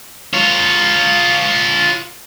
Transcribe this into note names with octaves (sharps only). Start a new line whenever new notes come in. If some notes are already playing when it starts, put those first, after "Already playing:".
F4 C#5